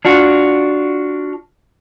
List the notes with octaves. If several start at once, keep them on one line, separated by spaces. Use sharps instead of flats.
D4 F4 F#4